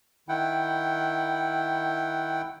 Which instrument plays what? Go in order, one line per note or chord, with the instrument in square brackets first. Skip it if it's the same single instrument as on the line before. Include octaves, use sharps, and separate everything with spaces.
[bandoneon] D#3 E4 F#5 G5